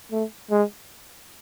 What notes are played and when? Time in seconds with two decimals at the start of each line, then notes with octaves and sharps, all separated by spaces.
0.12 A3
0.51 G#3